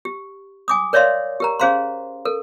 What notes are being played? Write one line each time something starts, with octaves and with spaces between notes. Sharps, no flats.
G4
G#5 D6 D#6
A#4 C#5 D5 E5 F5 C6
G4 A#4 A#5
C#4 G#4 C5 F5 A#5 C6
A4 A#4